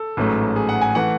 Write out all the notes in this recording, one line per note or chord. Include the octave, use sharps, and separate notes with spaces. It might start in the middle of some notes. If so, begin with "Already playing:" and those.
Already playing: A4
A1 G#2 F#3 A3
G#4
F#5
G#5
E3 A3 F#5